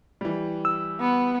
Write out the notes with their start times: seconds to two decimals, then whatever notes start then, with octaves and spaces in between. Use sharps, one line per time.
0.21 E3 G3
0.65 E6
1.00 B3